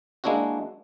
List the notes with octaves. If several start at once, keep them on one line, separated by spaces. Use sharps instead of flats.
G#3 A#3 D4 E4 F#4